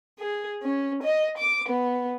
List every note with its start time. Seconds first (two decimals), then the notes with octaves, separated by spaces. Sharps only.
0.19 G#4
0.63 C#4
1.03 D#5
1.37 D6
1.70 B3